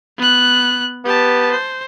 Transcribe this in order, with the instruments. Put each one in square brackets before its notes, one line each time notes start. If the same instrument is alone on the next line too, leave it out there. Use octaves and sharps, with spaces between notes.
[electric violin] B3 F#6
[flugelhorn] B3 [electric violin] G4 A5
[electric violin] C5